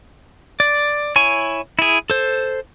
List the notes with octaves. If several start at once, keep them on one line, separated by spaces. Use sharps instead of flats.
D5
E4 C#5 G#5 C#6
E4 G#4
A4 C5